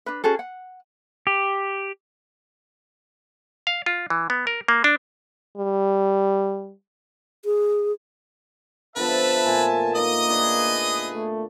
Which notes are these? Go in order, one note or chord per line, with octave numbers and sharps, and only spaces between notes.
D4 B4
C#4 F#4 G#4 A4
F#5
G4
F5
F4
E3
B3
A#4
A#3
D4
G3
G#4
D3 F3 B3 B4 E5 A5
A#2 A3 G#5 C6
A#3 D#4 D#5 D#6
D3 D#4 G#4 B4 D5
A3